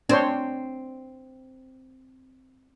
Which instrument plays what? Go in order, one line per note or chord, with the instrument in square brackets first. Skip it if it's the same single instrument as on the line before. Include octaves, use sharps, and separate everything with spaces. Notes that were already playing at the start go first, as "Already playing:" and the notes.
[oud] C4 [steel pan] D4 C5 C#5